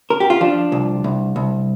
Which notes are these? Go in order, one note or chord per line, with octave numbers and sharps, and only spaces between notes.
A#4
G4
F4
F3 D4
C2
C2
C2